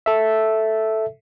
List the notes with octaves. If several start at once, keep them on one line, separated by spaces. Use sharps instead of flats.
A4 E5